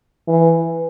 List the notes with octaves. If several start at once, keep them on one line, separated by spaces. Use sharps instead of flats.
E3